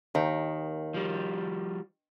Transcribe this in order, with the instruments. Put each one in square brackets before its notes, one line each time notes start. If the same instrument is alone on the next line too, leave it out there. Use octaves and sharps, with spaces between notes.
[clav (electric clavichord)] D#2 [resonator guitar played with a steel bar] D#3
[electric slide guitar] F3 G3